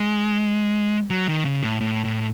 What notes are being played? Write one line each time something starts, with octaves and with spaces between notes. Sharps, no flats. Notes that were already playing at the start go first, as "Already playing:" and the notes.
Already playing: G#3
F#3
D#3
C#3
A2
A2
A2